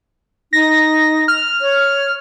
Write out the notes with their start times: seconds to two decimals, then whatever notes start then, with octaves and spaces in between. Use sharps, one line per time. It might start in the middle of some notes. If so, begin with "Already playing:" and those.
0.53 D#4 A#6
1.28 F6
1.61 C#5